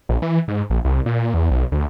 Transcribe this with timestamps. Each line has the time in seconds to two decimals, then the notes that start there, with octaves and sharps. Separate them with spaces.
0.09 A#1
0.22 E3
0.48 G#2
0.70 A#1
0.85 C2
1.06 A#2
1.34 E2
1.51 B1
1.72 D2